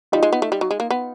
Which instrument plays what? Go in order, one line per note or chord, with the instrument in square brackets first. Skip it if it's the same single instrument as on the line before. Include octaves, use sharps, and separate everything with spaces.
[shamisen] G3 [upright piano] D#4 F4
[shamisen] G#3
B3
A3
G3
F#3
G#3
A#3
B3